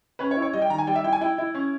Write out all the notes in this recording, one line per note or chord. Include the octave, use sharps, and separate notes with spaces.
C#4 B4
C#5
E4
C#5
G3 D#5
G5
D#3 A#5
G#5
G3 G5
E5
E4 G5
G#5
E4 G5
E4
C#4